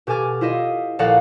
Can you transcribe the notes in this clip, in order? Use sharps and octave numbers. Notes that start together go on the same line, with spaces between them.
B2 G4 A4 G#5 D6 F6
E4 F4 C5 D#5 E5
A#1 A4 D5 F5 F#5 A#5